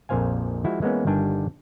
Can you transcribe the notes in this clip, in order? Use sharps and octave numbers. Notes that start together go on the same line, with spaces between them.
A#1 F2 A#2 C5 F5 G#5
F3 G#3 E4 F#4
E3 G#3 A#3 B3 C#4
G1 D#3 G3 D4 G#5